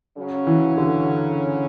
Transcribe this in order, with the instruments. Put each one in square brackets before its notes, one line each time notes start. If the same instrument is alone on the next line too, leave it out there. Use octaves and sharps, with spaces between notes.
[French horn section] C#3 F#3 C#4
[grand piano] E3
D3